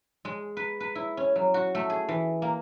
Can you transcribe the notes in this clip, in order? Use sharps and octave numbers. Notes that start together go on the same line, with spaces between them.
G#3
B4
B4
E4
C#4
F#3
F#4
A3
G#4
E3
A#3